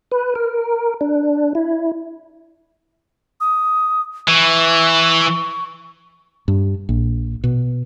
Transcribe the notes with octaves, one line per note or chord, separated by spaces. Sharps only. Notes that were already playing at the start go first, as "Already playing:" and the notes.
B4
A#4
D4
E4
D#6
E3 C#6
G2
A#1
B2